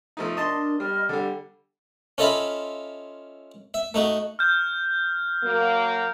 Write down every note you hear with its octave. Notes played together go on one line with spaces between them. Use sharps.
F3 A3 D#4
D4 A#4 D#5 A5 C6
G3 D#5 B5 F6
D3 G3 A4
C#4 F4 A4 D#5 E5 B5
E5
A3 D#4 F#4
F6 G6
F#3 A#3